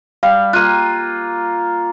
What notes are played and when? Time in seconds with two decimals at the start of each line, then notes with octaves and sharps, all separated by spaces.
0.23 G3 F5
0.53 A#3 F4 F#6 D#7